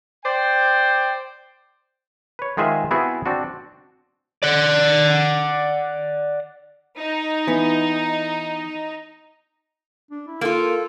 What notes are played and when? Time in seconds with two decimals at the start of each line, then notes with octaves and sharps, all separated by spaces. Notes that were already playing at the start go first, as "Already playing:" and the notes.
0.24 C5 D5 G5
2.39 B4 C#5
2.57 D#3 G#3 F4 G#4 C5 E5
2.91 B3 C4 E4 F#4 G#4 E5
3.26 C4 D4 F#4
4.43 D5 F#5
6.99 D#4
7.47 E3 B3
10.11 D4
10.28 E4
10.41 A#3 F4 A4